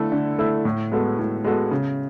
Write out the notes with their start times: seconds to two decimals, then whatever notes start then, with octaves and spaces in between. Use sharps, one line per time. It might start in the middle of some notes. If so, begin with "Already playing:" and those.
Already playing: D3 A3 E4 A4
0.12 D3
0.39 A3 E4 A4
0.65 A2
0.92 G#3 B3 F#4 A4
1.19 A2
1.44 G#3 B3 F#4 A4
1.71 C#3